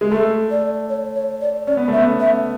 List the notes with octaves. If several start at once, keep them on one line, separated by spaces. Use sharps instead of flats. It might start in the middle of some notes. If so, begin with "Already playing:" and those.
G#3
A3 A4
D5
C#5
C#5
D5
C#4 D5
B3
A3
E5
B3
E5